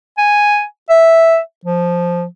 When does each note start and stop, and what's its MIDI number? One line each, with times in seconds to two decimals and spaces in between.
0.18 0.63 80
0.90 1.38 76
1.65 2.24 53